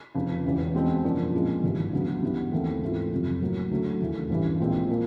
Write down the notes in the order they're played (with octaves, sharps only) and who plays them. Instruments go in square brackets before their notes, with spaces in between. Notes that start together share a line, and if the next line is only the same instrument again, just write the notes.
[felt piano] F1 F2 C#3
E1 E2 C#3 E3
B2 G#3 C4
F#2 C#3 F3 A#3 D4
A#2 F3 G#3 C4
G#1 G2 E3
D2 C#3 F#3 B3
G2 E3 G3 B3
D#2 C#3 E3 A3 C4
G#2 E3 A3 C4 F4
F#1 F2 C3
A2 F#3 A#3
D2 C#3 F#3 A3
E1 D#2 C#3 E3 A3
A1 G2 E3
A#1 A#2 F3 G#3 C4
A#2 F3 A#3